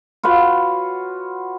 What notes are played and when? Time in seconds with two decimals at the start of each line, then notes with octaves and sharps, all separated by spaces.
0.23 F4 F#4 B4 C#5